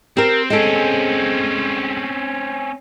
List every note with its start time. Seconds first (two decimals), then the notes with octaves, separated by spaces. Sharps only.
0.17 C4 G4 A#4
0.50 G#3 C4 C#4 A4